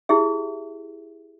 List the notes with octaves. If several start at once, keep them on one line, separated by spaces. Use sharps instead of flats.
E4 G4 G#4 E5